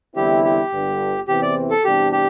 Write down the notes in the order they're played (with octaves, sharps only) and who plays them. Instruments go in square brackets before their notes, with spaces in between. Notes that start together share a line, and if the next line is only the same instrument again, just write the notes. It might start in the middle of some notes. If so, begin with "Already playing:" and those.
[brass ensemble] E2 D3 G3 C4 E4 [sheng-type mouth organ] G4
[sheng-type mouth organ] G4
[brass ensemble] G1 G2 D3
[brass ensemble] E2 C3 E3 C4 [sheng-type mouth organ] G4
[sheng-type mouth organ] D5
A4
[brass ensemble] E2 C3 G3 D4 [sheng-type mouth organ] G4
[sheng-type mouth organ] G4